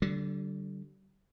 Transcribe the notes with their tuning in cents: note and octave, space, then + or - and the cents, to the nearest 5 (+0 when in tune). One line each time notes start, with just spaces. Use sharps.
D3 +0 G3 -35